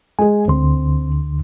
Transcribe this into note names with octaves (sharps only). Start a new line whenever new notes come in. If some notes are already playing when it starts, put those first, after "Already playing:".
G#3 G#4 G#5
D2 D3 C4 C6